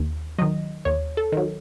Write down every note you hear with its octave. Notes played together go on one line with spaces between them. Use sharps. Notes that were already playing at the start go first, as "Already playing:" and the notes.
Already playing: D#2
D#3 F#3 D#5
D#2 C#5
A4
D#3 F#3